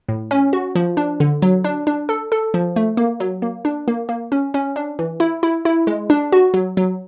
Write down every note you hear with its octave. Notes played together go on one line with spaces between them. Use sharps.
A2
C#4
F#4
F3
D4
D3
F#3
D4
D4
A4
A4
F3
A3
A#3
F#3
A#3
D4
A#3
A#3
C#4
C#4
D4
E3
E4
E4
E4
G#3
D4
F#4
F#3
F#3